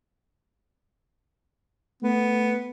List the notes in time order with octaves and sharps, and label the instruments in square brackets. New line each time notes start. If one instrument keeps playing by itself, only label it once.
[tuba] A3 [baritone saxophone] B3